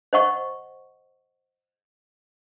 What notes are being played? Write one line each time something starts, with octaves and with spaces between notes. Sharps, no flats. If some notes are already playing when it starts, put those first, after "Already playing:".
C5 D#5 F#5 C#6